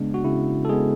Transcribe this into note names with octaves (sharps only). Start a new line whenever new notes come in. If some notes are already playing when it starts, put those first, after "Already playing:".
Already playing: C#3 G#3 B3 D4
F#4
C#3 E4
A4
G#3 B3 G#4